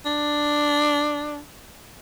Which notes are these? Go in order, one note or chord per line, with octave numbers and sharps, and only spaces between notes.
D4